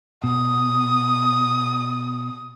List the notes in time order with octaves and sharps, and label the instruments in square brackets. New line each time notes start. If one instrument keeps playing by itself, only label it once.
[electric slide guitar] B2 [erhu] D#6